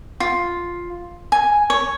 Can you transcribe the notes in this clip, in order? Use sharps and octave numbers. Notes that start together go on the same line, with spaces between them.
F4
G#5
C#5